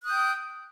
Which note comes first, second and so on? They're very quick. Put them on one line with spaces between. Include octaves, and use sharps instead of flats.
F#6 D#6 G6 G5